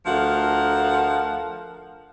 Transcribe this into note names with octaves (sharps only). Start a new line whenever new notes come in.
D2 F3 A3 A#4 F5 F#5